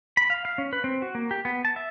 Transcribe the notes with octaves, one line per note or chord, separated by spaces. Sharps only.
B5
F5
F5
C#4
B4
C4
F#4
A#3
G4
B3
A5
E5